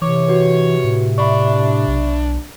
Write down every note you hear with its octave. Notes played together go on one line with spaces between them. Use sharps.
C3 E3 C#5 D6
F#4 B4 C#5
A2
D4 E5 B5 C#6
B1